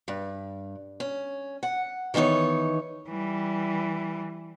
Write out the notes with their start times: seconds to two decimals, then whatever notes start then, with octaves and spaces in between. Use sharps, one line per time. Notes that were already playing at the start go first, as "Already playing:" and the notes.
0.08 G2
1.00 C#4
1.63 F#5
2.14 D#3 E3 B3 D#4 C#5
3.09 E3 G3